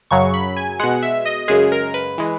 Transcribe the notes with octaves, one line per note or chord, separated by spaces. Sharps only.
F#2 C#3 F#3 C#6
B5
G#5
B2 G#3 F#5
E5
D#5
F#2 C#3 G#3 G#4
A#4
B4
E3 G#3